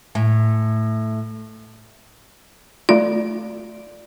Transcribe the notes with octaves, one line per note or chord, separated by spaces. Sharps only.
A2
A3 F4 D5